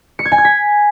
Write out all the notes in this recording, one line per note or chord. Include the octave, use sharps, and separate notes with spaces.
C#7
G#6
G#5
G#6
B6